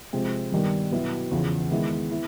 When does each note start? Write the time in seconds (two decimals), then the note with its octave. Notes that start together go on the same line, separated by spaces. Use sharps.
0.13 C3 F3 G#3 C4
0.52 G2 D#3 G3 B3
0.91 B2 F#3 B3 E4
1.31 E2 C#3 F3
1.71 D#3 G#3 B3 E4
2.11 B3 E4